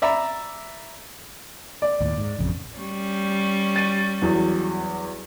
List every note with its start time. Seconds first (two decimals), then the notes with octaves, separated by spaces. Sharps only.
0.02 D5 E5 A#5 B5
1.82 D5
2.01 D#2 A2
2.18 G#2
2.39 A1 F2 C#3
2.78 G3 C#4
3.76 A6 D#7
4.22 E2 F#3